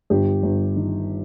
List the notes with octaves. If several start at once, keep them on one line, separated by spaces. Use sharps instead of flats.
G1 G4
G1
D#3